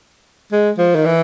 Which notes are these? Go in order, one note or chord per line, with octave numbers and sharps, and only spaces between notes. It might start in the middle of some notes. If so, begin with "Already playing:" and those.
G#3
F3
D#3
E3